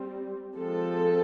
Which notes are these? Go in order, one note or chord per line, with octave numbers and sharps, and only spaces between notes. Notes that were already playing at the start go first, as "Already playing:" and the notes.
Already playing: G3 C4
F3 G#3 C4 A4